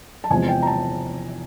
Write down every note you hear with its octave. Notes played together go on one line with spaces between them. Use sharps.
A5
E2 C3 F3 G#3 G#5
G5
A#5
A5